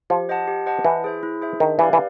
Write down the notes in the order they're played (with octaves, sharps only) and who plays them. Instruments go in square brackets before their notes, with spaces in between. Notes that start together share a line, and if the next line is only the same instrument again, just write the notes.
[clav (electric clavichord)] F3 [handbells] G4
[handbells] C5 D#5 F#5 A5
G4
C5 D#5 F#5 A5
[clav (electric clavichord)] E3 [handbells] E4
[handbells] G#4 C5 E5
E4
G#4 C5 E5
[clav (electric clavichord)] D#3 [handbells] D4
[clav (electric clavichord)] E3 [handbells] G4 B4 D5 F5
[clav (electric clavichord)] E3